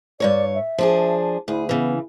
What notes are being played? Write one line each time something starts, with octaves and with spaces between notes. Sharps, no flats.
G2 A#2 C#5 D5
E5
F3 D4 G#4
D2 E4 G#4
C#3 E3 B3